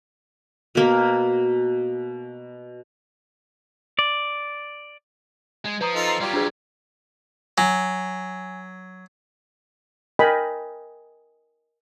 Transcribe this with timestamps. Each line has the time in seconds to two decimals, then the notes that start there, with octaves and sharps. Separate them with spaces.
0.75 B2 A#3
3.99 D5
5.65 G#3
5.81 F3 B4 A#5 D#6
5.95 D#4 F4 A4
6.07 A#5 C6 C7
6.21 F#3 G3 F4 G4
6.34 D4 G#4
7.58 F#3 G#5
10.19 A#4 D#5 G5 G#5 B5